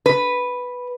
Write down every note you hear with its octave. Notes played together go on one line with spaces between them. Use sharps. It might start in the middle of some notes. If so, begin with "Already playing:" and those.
B4